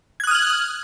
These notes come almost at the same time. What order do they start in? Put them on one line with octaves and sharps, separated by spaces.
G#6 F#6 D#6 F6 F#7